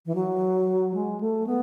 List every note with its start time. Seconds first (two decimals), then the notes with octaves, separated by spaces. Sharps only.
0.06 E3
0.15 F#3
0.94 G#3
1.21 A3
1.47 B3